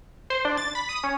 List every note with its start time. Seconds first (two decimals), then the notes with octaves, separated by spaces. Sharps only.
0.30 C5
0.45 D4
0.58 A6
0.75 B5
0.89 D#6
1.03 C#4